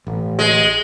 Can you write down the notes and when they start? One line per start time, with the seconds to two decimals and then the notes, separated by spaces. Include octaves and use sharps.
0.07 A1
0.39 G#3